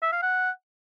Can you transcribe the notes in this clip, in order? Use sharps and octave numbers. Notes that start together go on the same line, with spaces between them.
E5
F5
F#5